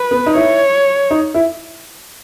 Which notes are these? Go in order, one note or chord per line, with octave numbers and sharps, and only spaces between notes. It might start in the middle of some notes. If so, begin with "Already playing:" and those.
Already playing: B4
B3
D#4
E4 C#5
D#4
E4